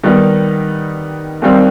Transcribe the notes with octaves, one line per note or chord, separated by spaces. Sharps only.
D#3 G3 B3 D#4
D#2 D#3 G3 C4